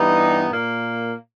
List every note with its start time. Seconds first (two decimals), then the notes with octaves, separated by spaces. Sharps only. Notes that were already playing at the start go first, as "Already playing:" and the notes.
Already playing: G2 E3 G3 B3 D#4
0.51 A#2 A#3